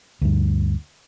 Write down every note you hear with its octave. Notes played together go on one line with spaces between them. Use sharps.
D2 G2